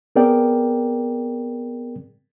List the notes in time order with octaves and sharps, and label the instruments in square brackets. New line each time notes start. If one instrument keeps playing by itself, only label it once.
[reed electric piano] B3 C4 G#4 A#4 D5 G5